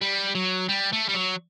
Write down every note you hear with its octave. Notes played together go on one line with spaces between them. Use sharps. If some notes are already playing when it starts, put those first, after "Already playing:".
G3
F#3
G3
A3
G3
F#3